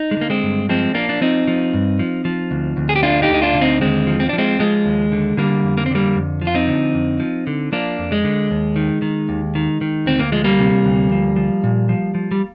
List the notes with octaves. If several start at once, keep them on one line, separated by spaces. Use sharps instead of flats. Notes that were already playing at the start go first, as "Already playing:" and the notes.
Already playing: D#4
G#3
D3 A#3
G#3 C4
G2
F3 G#3 C4
F3 A#3 D4
D4
F3 C4 D#4
F3
G2
F3
F3
D2
D2
G#4
G4
D3 D4 F4
D#4 G4
D2
D#4
D4 F4
D3
C4 D#4
D#2 G#3 C4
F3
C4
D4
F3
G#3 C4
F3 G#3
D#2
D3
D3 G3 A#3
F2
A#3
C4
D3 G3 A#3
F2
F3
F4
C4 D#4
D3
F2
F3
D3
F3 A#3 D4
F2
G#3
D3
D#2
D#3
D#3
D#2
D#3
D#3
D2 C4
A#3
F3 G#3
G3 A#3
C3
D2
F3
F3
A#2
F3
F3
G3